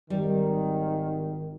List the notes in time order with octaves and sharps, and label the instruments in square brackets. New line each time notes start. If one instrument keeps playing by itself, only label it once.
[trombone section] G#1 D#3 [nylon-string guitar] G3